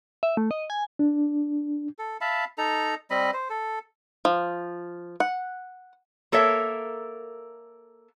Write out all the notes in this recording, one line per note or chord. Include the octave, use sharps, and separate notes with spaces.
E5
A3
D#5
G#5
D4
A4
E5 F5 A5 B5
D#4 A4 A#5
G3 C4 D#5 B5
C5
A4
F3
F#5
A#3 A4 A#4 C#5 E5